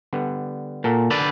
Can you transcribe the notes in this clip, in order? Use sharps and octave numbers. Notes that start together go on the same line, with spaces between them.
D3 G3 B3
A#2 F#4 A4 A#4
D3 B4 D5